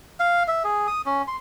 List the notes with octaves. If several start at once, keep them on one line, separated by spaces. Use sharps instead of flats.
F5
E5
G#4
D#6
C#4
C6